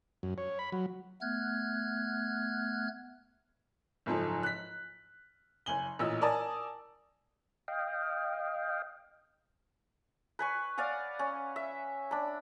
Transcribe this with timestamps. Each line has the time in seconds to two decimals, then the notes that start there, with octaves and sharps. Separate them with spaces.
0.23 F#2
0.38 C#5
0.59 B5
0.72 F#3
1.21 A3 B3 F6 F#6 G#6
4.06 F#1 G#2 F3 A4
4.43 F#6 B6
5.66 F#1 G#5 F#7 G7
5.99 A1 A#2 D#5 E6
6.21 A#4 D5 G#5 A5 D#6
7.68 D#5 F5 G5
10.39 B4 G#5 C#6
10.78 D5 F5 F#5 G#5
11.19 C#4
11.56 E5
12.11 D4 B5